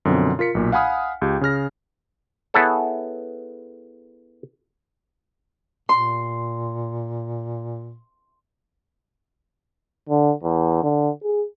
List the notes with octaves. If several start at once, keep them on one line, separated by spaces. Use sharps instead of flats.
F#2 B2 D3 F3 C4
F4 A#4 B6 C#7
B1 A#2
F5 F#5 G#5 B5 D#6 F6
C#2 G4
C#3 G#4 F6 A#6
B3 E4 G#4 A4 C#5
A#2 C6
D3
E2
D3
G#4